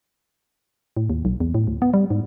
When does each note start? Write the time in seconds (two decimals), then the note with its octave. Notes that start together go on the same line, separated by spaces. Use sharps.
0.97 A2
1.10 D#2
1.25 B1
1.40 E2
1.55 A2
1.67 D2
1.82 B3
1.94 G3
2.10 G#2